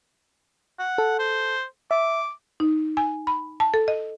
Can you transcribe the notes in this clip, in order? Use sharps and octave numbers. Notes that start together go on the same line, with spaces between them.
F#5
A4
C5
E5 D6
D#4
G#5
B5
A5
A4
D#5